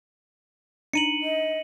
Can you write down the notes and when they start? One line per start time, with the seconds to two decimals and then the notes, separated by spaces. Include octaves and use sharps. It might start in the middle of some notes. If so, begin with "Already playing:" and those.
0.93 D4 D#4 A#5 C#7 D#7 F#7
1.23 D#5